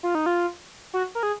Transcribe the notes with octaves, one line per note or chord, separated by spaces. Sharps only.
F4
D#4
F4
F#4
A#4
G#4